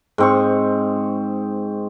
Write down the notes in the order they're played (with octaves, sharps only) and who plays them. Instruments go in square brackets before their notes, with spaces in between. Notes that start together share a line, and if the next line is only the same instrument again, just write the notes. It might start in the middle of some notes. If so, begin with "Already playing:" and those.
[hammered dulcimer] G#2 C4 C#6